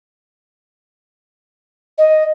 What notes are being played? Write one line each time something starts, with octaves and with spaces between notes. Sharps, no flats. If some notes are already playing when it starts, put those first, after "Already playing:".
D#5